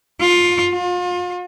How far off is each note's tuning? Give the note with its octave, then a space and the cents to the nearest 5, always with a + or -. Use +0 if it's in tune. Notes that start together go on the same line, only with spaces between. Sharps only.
F4 +15
F4 +35